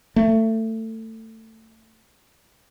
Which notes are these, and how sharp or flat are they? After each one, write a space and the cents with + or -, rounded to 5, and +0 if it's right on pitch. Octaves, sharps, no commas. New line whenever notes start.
A3 +20